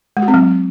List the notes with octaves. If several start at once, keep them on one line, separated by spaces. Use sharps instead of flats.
G#3
F#4
C4
F#3